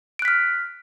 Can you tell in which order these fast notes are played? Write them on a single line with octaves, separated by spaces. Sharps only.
D7 F#6 B6 F6